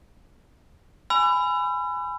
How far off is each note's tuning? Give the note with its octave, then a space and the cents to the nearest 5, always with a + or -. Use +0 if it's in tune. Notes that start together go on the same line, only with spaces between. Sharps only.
G#5 +0 B5 +20 E6 +40